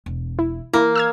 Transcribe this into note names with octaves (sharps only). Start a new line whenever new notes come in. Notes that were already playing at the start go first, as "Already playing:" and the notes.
E1
E4
E3 A#3 E4
E6 F6 G#6